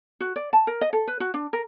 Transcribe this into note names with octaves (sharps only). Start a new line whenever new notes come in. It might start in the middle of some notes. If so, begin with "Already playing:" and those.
F#4
D5
A5
A#4
D#5
A4
B4
F#4
D4
A#4